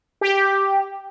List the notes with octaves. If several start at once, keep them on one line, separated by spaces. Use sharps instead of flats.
G4